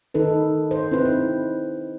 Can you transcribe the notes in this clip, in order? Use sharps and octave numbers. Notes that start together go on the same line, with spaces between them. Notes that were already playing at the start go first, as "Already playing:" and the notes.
D#3 D#4 A4 B4
B4 C5
C4 D#4 E4 B4
C4